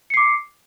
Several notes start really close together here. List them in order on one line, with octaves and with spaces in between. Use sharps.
C#7 C7 D6